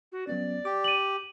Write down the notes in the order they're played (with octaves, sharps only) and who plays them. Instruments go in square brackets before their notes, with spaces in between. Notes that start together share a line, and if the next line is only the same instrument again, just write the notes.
[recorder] F#4
[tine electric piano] F#3 B3 C#4 [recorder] D5
[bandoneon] G4 [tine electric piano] D6
[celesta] D#7 F#7